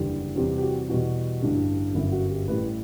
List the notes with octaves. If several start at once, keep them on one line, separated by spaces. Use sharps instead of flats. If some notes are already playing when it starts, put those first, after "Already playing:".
Already playing: F#1 E2 D3 G3
E2 C3 G3 G4
G4
F#4
E2 B2 G3 F#4
A1 G2 D3 G3
G1 F#2 F#3 E4
F#4
G4
A1 A2 G3 B4